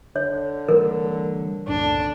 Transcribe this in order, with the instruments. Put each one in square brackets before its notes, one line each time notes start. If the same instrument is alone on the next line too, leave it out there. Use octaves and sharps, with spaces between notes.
[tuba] D3 [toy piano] C#5
[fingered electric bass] E3 G3 [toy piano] A#4
[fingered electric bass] C2 F#2 A2 [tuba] D3 [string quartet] D4